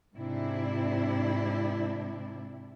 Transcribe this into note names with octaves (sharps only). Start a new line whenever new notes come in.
G#2 C3 D4 E4